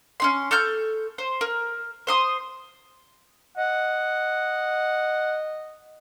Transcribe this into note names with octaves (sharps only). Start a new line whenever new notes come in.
C#4 D#4 C6
A4 C#6 F6 G6
C5
A#4
C5 C6 D#6
D#5 F#5